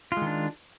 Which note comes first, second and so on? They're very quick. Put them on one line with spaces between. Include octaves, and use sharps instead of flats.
F4 G#3 D#3 D4